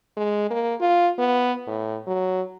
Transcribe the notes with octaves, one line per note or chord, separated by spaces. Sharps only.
G#3
A#3
F4
B3
A2
F#3